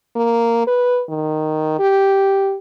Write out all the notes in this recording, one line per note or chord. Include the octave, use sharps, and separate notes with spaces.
A#3
B4
D#3
G4